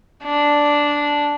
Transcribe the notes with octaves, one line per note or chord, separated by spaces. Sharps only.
D4